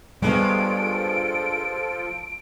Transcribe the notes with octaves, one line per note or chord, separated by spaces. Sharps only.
G2 F3 G3 G#3 B3 F4 A4 D7